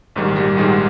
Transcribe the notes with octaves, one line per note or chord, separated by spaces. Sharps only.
A#1 G#2 D#3 G3
G3
A#1 G#2 D#3 G3 G#3